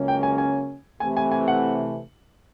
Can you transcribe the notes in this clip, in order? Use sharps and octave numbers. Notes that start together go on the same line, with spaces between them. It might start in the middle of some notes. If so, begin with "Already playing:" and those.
Already playing: C#2 C#3 F#3 A#3 C#4
G5
G#5
G#5
C3 E3 A3 G#5
G#5
G#5
F#5